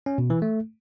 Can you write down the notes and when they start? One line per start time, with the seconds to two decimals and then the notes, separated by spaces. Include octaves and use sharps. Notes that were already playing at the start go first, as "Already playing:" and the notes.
0.06 C#4
0.18 B2
0.30 E3
0.42 A3